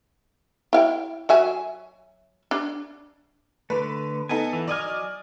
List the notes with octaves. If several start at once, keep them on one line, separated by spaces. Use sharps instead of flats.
E4 F5 G5
F#3 E5 G#5
D4
D3 A3 B4
B3 D#4 A4 G#5
E3
F#3 D5 D#5 G#5 D6 F6